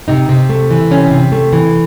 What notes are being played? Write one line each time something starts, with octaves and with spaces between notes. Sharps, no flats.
C3 D#4
C3
A3
E3
C3 C#4
C3
A3
E3